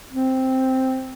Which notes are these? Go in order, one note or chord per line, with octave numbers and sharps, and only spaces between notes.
C4